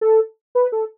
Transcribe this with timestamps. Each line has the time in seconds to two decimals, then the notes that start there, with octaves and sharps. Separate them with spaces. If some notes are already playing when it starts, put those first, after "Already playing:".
0.01 A4
0.55 B4
0.72 A4